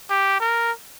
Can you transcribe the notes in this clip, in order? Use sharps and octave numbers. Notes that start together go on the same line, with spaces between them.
G4
A#4